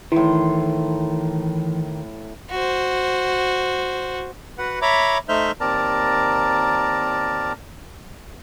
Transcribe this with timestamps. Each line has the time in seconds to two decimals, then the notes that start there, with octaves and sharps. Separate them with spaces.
0.12 A2 D#3 E3 C6
2.50 F#4 C5
4.58 F#4 B4 F#5
4.82 C#5 E5 A#5 B5 D6
5.29 A3 D#4 C5 E5 F6 G6
5.60 D#2 C4 A#4 D5 A5 A#5